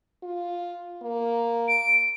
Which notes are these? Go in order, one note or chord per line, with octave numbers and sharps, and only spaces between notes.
F4
A#3
D7